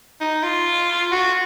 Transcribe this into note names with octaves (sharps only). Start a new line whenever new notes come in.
D#4
F4
F#4